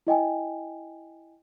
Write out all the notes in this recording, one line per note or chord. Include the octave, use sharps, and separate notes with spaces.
E4 D#5 G5 G#5